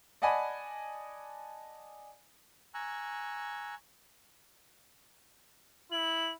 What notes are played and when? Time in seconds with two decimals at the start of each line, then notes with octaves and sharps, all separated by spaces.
0.22 D5 D#5 F#5 G#5 A5 B5
2.74 G#5 A#5 C#6 E6 F#6
5.92 E4 F#7